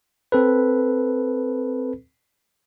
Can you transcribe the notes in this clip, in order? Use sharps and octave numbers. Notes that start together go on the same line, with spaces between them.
C4 A4 B4